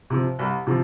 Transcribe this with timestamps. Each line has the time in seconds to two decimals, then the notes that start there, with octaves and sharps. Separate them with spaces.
0.10 C3 F3
0.39 C2
0.67 C3 F3